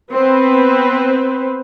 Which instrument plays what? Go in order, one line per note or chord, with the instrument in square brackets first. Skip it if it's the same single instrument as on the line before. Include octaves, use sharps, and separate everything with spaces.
[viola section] B3 C4 B4 C5